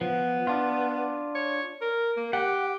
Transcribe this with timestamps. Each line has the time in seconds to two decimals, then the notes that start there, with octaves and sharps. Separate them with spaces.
0.01 F3 B3
0.47 D4 F4
1.35 C#5
1.81 A#4
2.17 A#3
2.33 G4 F#5